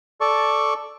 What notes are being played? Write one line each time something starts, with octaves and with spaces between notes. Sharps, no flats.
A4 D5 C#6